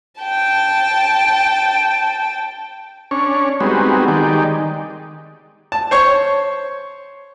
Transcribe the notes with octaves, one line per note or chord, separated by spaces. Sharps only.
G5 A5
C#4 D4 C#5
G3 G#3 B3 C4 D#4 F#4
D#3 G#3 D#4 G4 D5
A5
C5 C#5 C#6